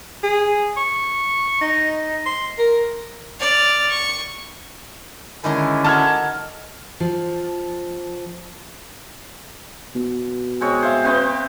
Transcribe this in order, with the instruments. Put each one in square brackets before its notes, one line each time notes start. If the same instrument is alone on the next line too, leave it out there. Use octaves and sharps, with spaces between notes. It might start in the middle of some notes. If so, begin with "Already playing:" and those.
[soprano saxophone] G#4
C#6
D#4
C6
A#4
[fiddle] D5 F6
C#6
[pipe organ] D3 C#4 E4 [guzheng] D#3 G#3 A#4
[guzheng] D#4 F#4 A4 [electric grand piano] A5 F6 G#6
[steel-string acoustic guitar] F3
[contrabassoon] B2
[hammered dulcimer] G#3 C4 C#5
C5 E5 F5
B3 C4 G5